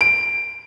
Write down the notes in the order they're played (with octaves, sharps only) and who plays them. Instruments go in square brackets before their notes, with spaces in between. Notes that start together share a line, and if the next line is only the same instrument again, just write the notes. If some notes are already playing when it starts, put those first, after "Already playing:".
[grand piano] D7